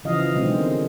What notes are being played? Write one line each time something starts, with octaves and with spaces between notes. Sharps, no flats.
C#3 E3 F3 D#5 F5
B2 D3 D#3 F#3 G#3 C4